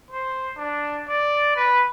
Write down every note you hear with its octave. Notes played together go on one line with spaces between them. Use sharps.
C5
D4
D5
B4